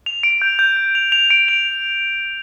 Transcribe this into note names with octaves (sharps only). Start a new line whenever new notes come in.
F7
D7
G6
G6
G6
F7
F7
D7
F7